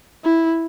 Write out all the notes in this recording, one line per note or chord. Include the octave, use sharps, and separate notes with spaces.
E4